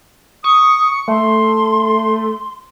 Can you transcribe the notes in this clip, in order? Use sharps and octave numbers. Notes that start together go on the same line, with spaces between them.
C#6 D#6
A3 C6